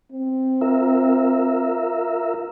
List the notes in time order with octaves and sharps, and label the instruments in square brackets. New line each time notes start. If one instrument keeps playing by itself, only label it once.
[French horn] C4
[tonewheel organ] F4 A#4 E5